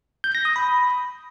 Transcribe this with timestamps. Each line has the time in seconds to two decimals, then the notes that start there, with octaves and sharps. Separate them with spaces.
0.24 G6
0.35 A#6
0.45 D#6
0.56 B5